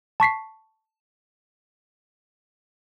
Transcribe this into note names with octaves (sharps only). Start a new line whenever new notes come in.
A5 C#6 B6 C7